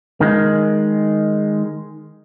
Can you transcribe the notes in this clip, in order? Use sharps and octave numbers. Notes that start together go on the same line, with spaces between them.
D#3 G#3